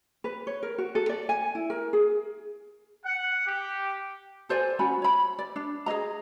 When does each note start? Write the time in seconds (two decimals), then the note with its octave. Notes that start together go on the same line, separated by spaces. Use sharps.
0.24 B4
0.47 C#5
0.63 A#4
0.78 F#4
0.95 A4
1.09 D5
1.29 G#5
1.55 E4
1.70 A#4
1.93 G#4
3.05 F#5
3.47 G4
4.49 A4 C5 D5 G#5
4.79 C#4 F#4 G#5 B5
5.02 C#5 B5
5.39 D5
5.56 D4
5.86 G#4 C#5 D#5 A#5